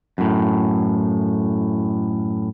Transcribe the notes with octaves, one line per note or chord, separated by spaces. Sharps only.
F#2 A2